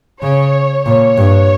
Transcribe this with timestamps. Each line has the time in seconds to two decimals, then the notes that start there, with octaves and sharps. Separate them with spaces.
0.21 C#3 C#5
0.86 A#2 C#5
1.17 G2